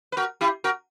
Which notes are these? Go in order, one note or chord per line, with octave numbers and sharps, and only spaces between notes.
B4
F#4 A#4
E4 G4
F#4 A#4